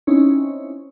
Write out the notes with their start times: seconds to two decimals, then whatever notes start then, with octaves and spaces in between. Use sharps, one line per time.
0.07 C4 C#4 D#4 E4 C#5